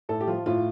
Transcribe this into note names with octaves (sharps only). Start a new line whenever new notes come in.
A2 A4
G4
F3 F4
A2 F4